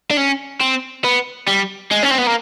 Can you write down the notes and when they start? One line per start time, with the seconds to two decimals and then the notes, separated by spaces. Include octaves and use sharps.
0.11 D4
0.17 C#4
0.60 C4
1.04 B3
1.47 G3
1.91 G#3
2.03 C#4
2.11 C4
2.18 B3
2.26 A#3